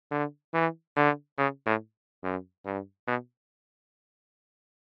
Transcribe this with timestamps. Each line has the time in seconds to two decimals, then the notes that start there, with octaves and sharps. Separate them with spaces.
0.11 D3
0.54 E3
0.97 D3
1.38 C#3
1.66 A2
2.23 F#2
2.66 G2
3.08 B2